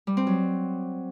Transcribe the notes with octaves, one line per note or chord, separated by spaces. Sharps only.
G3
C4
F#3